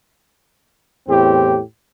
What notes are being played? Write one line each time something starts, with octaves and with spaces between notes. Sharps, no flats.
E2 A2 C4 G4